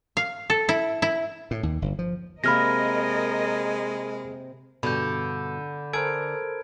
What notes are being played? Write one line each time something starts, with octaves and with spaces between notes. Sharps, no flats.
F5
A4
E4
E4
A2
D#2
G1
F3
C3 G#3 A#3 A#4 D#5 B5 F6 A#6
G2 B2 D3 B5 G6
A4 A#4 C5 G#5 G#6 D7